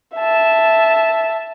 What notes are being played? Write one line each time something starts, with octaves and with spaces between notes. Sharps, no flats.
E5 A5